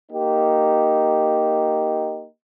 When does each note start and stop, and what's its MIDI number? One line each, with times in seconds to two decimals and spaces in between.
0.11 2.25 58
0.11 2.25 63
0.11 2.25 67